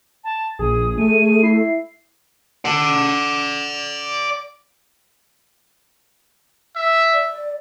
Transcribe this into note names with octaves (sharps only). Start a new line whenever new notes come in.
A5
A#1 G#4 D#6
A3 D#7
E4 C7
D5 F#5
E5
D5